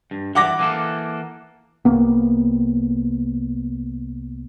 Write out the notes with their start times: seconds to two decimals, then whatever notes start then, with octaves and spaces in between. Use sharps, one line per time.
0.11 G2
0.35 E3 F#5 D6 A#6
0.59 E3 A#3 A4
1.85 C2 A#3 B3